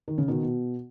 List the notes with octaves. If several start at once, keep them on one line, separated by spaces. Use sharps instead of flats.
D#3
C#3
B2 D#3
B2